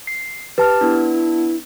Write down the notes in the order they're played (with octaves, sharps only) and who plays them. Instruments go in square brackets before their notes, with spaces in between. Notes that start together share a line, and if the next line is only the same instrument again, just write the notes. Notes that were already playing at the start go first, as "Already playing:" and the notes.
[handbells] C7
[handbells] G4 A5 F6 [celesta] B4
[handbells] B3 D4 [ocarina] E4